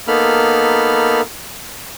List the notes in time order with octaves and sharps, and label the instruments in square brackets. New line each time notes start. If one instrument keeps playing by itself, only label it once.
[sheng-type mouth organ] A#3 B3 D#4 A4 B5 F6